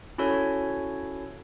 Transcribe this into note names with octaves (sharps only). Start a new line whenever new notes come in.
C#4 E4 F#4 A4 C#5